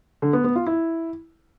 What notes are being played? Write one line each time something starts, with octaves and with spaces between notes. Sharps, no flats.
D3
B3
B3
F4
E4